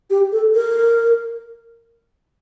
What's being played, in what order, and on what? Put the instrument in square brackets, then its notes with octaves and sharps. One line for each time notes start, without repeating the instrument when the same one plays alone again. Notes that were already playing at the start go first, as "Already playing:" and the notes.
[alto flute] G4
A4
A#4